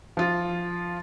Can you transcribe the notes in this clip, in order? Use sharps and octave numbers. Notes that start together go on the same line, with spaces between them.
F3 F4